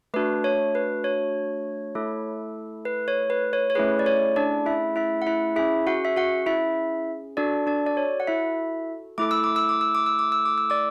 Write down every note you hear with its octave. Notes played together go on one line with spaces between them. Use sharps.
A3 D4 F#4 B4
C#5
B4
C#5
A3 E4 A4
B4
C#5
B4
C#5
C#5
A3 C#4 E4 G#4 B4
D5
C#5
D4 D5
E4 E5
E4 E5
F#5
E4 E5
C#4 E4 G#4 E5
F#4 F#5
E5
F#4 F#5
E4 E5
D4 F#4 A4 D5
D4 D5
D5
C#5
F#5
E4 E5
A3 E4 A4 D6
E6
D6
E6
D6
E6
D6
E6
D6
E6
D6
E6
D5 D6